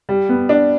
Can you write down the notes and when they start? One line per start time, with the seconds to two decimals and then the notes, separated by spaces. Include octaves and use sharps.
0.09 G3
0.29 B3
0.49 D4